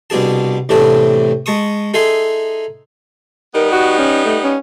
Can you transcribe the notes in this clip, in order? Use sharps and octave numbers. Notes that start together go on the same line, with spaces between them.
C2 B2 D4 G#4 A5
E2 A2 C3 A3 D4 A5
G#3 A5 C#6 D#6
D#4 G#4 A4 E5 G#5 C6
G3 B3 D#4 A#4
F#4
C#4
A3
C#4